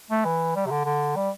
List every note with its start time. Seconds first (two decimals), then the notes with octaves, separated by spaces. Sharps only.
0.10 A3
0.25 E3
0.56 G3
0.66 C3
0.71 D3
0.85 D3
1.16 G3